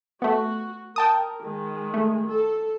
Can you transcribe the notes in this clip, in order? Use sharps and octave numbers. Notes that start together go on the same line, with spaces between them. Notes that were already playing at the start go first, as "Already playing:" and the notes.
A3 B3 F#4
A#4 G5 A5 D#6
D#3 G#3
A3
A4